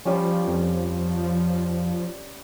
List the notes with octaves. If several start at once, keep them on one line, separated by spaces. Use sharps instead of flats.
F3 G3 C#4
F2